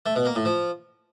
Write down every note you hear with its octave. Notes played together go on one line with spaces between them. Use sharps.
A3
B2
A#3
A2
F3